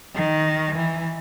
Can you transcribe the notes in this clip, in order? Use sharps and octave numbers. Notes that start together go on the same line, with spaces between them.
D#3
E3